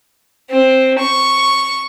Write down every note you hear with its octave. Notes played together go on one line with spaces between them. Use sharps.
C4
C#6